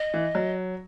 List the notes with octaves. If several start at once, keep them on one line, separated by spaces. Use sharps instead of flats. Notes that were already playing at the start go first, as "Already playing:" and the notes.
Already playing: D#5
E3
F#3